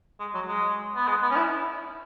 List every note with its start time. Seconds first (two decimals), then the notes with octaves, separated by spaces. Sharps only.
0.20 G#3
0.34 F#3
0.49 G#3
0.96 B3
1.08 G#3
1.22 B3
1.31 C#4
1.36 E4